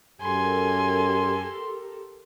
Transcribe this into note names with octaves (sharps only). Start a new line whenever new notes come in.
F#2 G4 A4 A#4 G#5 C6